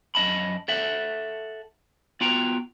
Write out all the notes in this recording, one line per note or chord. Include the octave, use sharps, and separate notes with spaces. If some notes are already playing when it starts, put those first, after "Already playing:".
F#2 C4 D#5 A5 B5
A4 E5 F#5
B3 F4 F#4 G5 A#5